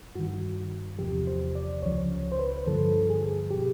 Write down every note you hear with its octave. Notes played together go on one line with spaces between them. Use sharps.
G2 D#3 F#4
E2 C3 F3 G4
C5
D5
C#2 C#3 F3 C#5
C5
B4
G2 D3 F3 A4
G#4
B2 G4